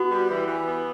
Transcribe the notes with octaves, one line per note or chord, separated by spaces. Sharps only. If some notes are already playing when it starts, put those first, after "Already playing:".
Already playing: B3 F#4
G3
E3
E3
B3